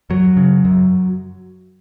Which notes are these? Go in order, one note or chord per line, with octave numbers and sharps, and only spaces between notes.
F#2 F#3
C#3
F#2